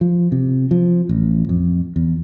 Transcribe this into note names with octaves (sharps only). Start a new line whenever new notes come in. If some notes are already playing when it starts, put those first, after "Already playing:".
F3
C3
F3
A1
F2
E2